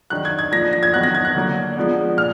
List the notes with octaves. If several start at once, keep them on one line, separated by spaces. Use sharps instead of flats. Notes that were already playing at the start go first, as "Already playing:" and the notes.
D#3 F#3 D4 F#6
G#6
G#6
F3 A#3 D4 A#6
A#6
G#6
D#3 F#3 B3 F#6
A#6
G#6
F#6
D3 F#3 A#3 D4
F3 G#3 B3 D4
A#2 F6